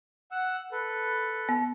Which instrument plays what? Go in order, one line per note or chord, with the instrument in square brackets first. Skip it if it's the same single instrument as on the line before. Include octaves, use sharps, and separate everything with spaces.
[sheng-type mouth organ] F#5 E6
A4 B4
[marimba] B3